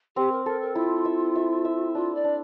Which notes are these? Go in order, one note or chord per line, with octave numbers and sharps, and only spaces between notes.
C4 G4
A#4
A4 A#4
A#4
E4 F4
E5
E5
E5
D4 F4
D5
D4